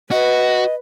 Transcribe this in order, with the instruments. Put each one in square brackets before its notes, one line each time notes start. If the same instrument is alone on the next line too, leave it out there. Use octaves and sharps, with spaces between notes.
[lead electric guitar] F#4 [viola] B4 [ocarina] D#5